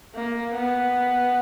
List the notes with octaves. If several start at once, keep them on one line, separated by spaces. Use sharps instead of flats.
A#3
B3